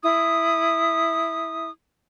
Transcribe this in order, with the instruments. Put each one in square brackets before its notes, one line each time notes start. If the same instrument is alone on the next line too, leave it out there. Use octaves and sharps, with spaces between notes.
[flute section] E4 D#6